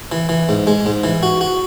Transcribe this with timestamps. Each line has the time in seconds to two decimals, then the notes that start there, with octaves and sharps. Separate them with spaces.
0.12 E3
0.29 E3
0.49 G#2
0.67 G#3
0.86 G#2
1.04 E3
1.23 F#4
1.41 F#4